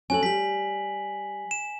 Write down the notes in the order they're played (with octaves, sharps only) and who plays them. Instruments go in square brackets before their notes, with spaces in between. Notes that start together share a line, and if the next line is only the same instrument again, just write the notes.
[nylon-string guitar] C#4 F#4 A4 [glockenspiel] G#5 F#7
[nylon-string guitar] G3 [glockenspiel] B6 F#7
[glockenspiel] E7